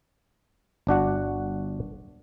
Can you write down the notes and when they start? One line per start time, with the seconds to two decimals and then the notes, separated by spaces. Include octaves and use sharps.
0.87 G1 D4 F#4 F#5